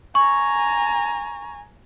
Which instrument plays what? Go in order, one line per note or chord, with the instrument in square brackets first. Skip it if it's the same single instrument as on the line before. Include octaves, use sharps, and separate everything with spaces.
[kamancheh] G#5 A#5 [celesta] C#6